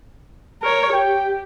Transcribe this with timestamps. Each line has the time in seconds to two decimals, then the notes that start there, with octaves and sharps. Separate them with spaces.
0.63 A#4 C#5
0.93 G4 G5